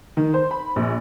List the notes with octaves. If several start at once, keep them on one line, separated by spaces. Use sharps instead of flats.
D#3
C5
B5
A#1